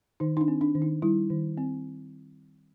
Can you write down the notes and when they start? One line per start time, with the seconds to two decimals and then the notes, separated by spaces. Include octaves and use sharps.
0.20 D#3 D#4
0.37 D#4
0.41 D4
0.48 C4
0.61 D4
0.75 D#3
0.82 D#4
1.02 G3 E4
1.30 D#3
1.57 C4